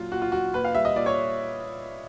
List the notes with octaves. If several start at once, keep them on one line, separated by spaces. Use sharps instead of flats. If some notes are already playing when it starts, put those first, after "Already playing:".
Already playing: A#2 F#3 F4
A#2 F#4
F4
F#3 F#4
A#2 B4
F5
G3 E5
D#5
A#2 D5
C#5